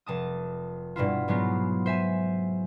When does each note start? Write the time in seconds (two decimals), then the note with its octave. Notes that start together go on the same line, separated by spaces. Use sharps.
0.06 F1 A5 D#6
0.96 G2 B2 E4 F4
1.28 G#2 F#3 G#3 B3 F4
1.86 C5 E5 G#5